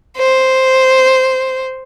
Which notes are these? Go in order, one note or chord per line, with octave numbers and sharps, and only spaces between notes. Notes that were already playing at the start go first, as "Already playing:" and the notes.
C5